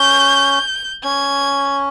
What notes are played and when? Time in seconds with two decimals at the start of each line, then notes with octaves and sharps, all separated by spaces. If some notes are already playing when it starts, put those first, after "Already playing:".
Already playing: C#4 G6
1.04 C#4 G#6